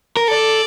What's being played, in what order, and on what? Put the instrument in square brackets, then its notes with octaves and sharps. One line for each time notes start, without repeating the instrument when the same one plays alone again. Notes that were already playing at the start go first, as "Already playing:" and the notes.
[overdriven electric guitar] A#4
[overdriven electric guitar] A4 [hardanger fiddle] D5